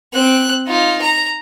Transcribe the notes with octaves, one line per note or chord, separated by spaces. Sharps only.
C4 F#6
D#4 F4
A#5